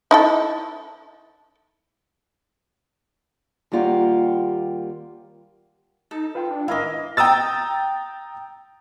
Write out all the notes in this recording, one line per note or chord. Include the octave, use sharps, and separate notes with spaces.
D#4 E4 A4
D#2 G3 A#3 F4 G4 F#5
D#4 A4
F4 B4 G5
D4
G#1 E4 A#4 D#5 F5 D6
G5 A#5 D#6 E6 A6